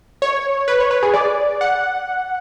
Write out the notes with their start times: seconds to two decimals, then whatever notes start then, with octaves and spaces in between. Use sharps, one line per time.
0.22 C#5
0.68 B4
0.80 C#5
0.91 B4
1.03 G#4
1.14 D5
1.61 F#5